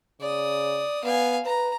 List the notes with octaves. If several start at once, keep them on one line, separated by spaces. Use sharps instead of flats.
C#3 D5 D#6
B3 F5 G#5
B4 A#5